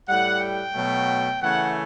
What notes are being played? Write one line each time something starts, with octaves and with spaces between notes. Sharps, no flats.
A2 G3 F#5
G5
B2 F#3 A3
C#3 E3 A3 F#5